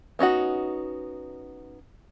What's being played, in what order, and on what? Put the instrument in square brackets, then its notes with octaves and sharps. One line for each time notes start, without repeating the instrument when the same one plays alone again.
[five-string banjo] B3 C#4 D#4 F#4